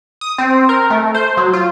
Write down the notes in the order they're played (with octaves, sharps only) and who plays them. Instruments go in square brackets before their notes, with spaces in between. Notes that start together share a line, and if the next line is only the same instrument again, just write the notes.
[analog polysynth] D#6
C4
A#4
A3
C5
F#3
F4